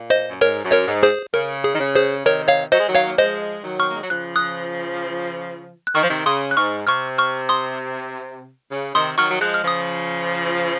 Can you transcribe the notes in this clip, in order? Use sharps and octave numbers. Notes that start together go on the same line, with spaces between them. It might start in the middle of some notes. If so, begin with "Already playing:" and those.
Already playing: A#2
C5 D#5
F#2
G#2 A#4 C#5
F#2
A#4 C#5
G#2
G#4 C5
C#3 A#4
G#4
D#3
C#3
G#4 C5
C3 D#3 A#4 C#5
C#5 F5
F#3 C5 D#5
G#3
D#3 F#3
C#5 F5
A#3
F3 G#3 C5 D#5
D#3 F#3
C4 C#6 F6
A#3
G#3
F#3
C#3 F3 F#6
D#6 F#6
F#6
D#3 C#6 F6
F3
C3 D#3
C#3 C6 D#6
F#6
G#2 C#6 F6
C3 C#6 F6
C#6 F6
C6 D#6
C#3
C3 D#3 C6 D#6
D#3 F#3 C#6 F6
F#3
F3 G#3 F#6
F6
C#3 F3 D#6